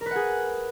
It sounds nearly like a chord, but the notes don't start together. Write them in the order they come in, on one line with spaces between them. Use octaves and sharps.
A#4 B4 F#5 G#4